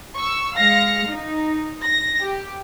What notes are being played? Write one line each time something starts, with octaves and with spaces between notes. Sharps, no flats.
C#6 E6
G#3 F5 F6 A#6 C#7
D#4
A#6
G4